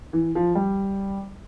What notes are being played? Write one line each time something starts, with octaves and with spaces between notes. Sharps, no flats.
E3
F3
G3